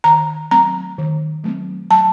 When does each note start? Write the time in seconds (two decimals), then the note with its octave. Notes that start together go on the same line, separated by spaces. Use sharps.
0.04 D#3 A#5
0.51 F#3 A3 C4 A#5
0.98 D#3
1.44 F#3 A3 C4
1.91 F#3 A5